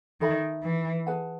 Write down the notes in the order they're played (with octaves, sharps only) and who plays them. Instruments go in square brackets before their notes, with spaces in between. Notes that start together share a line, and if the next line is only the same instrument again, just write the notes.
[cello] D#3 [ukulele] A4 E5 B5
[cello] E3
[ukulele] G#4 B4 F#5 A5